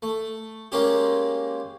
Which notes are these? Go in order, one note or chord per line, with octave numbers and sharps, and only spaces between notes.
A3
G#3 A#3 C#4 G4